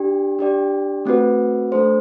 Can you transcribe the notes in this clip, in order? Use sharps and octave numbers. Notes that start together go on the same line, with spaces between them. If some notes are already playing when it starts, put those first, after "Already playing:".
Already playing: D4 G4 D5
D4 G4 D5 G5
A3 C4 F#4 B4
A3 D4 A4 C5